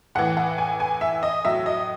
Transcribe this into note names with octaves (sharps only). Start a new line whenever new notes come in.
A2 E3 F#5
F#5
G#5
G#5
E5
D#5
A2 F#3 E5
D#5